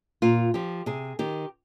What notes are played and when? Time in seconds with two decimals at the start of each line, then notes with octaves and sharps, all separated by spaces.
0.22 A#2 F4
0.54 F3 G4
0.86 C3 G#4
1.19 D#3 G4